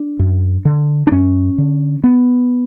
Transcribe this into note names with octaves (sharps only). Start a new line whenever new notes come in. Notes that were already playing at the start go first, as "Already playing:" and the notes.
Already playing: D4
F#2
D3
D4
F#2 C#4
D3
B3